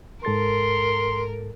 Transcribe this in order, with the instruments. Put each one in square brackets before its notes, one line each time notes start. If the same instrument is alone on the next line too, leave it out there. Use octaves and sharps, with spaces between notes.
[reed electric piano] G#2 A4 A6 [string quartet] A#4 [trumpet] C6